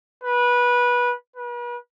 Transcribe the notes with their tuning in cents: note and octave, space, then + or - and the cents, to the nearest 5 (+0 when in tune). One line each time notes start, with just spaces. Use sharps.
B4 -20
B4 -40